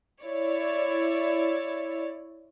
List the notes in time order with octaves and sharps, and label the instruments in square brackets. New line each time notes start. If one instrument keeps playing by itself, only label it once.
[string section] E4 C#5 D5